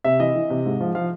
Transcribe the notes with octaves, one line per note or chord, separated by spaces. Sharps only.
C3 E5
E3 D#5
E3
C3
G#2
F3
F3 F5